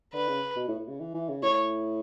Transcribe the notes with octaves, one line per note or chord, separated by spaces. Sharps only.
D3 B4
C#3
B2
A2
A2
C#3
E3
E3
C#3
A2 C#5